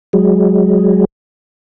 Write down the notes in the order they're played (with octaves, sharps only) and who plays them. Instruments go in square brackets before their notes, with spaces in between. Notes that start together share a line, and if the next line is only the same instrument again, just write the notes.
[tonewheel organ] F#3 G#3